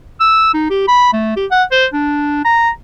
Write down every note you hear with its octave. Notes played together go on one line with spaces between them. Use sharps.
E6
D#4
G4
B5
A3
G4
F#5
C5
D4
A#5